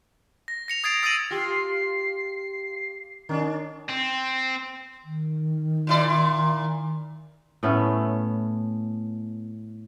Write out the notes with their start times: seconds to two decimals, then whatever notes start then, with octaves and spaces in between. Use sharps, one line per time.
0.48 A#6
0.68 A#6 C#7 F7
0.84 D#6 G#6 A6 C7 D7 F7
1.03 D#6 E6 A6 A#6 D#7 F#7
1.31 F4 G4 C7
3.29 D#3 C#4 D4
3.89 C4
5.04 D#3
5.87 A#2 E4 D5
7.63 A2 A3 B3 C#4